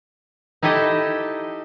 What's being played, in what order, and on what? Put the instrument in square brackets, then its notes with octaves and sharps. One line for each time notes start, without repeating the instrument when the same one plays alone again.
[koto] D#4 E4 G4 A4 D#5